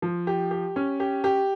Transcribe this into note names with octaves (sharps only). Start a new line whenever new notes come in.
F3
G4
G4
C#4
G4
G4